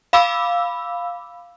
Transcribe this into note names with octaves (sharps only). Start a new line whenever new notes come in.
F5 B5 D6 E6